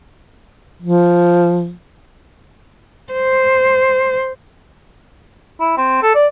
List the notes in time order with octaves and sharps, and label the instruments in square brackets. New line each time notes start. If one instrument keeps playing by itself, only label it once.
[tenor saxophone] F3
[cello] C5
[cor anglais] E4
C4
A4
D5